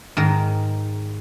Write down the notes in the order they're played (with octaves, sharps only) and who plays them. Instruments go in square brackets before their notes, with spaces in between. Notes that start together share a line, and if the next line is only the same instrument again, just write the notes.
[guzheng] G#2 D#3 A#4